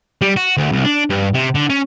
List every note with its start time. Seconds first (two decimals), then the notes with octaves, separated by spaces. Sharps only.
0.22 G3
0.37 F#4
0.57 D2
0.72 C2
0.85 D4
1.10 G2
1.34 C3
1.55 D3
1.70 C#4